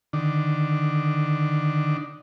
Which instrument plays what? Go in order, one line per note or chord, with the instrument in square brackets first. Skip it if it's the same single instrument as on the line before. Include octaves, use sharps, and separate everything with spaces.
[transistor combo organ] D3 D#3 D4